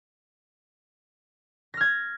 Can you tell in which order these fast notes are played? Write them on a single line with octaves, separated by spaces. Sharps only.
A#6 F6 G#6